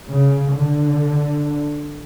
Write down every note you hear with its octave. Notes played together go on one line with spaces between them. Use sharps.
C#3
D3